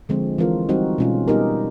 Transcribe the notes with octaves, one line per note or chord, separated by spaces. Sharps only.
D3 F3 G#3 C4
E3 G#3 C4 F4 A#4
G3 C4 D#4 F#4
B2 G#3 C#4 F4
G3 B3 D#4 G4 A#4